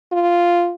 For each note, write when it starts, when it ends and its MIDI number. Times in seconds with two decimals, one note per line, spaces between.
0.12 0.73 65